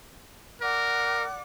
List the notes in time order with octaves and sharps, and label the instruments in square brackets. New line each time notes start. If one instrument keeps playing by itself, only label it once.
[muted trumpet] A#4 [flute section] D5 F#5 D6